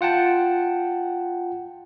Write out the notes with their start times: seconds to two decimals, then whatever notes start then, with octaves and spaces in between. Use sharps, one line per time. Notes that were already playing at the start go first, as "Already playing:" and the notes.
0.01 F4 F#5 G5 A5